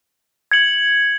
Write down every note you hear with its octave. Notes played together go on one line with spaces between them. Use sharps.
G#6 C#7 F#7